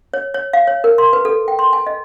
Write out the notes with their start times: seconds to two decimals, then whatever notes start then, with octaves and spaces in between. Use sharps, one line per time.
0.14 C#5
0.34 C#5
0.53 F5
0.67 C#5
0.84 A#4
0.98 C6
1.13 B4
1.25 A4
1.48 G5
1.59 C6
1.73 G#5
1.86 D#5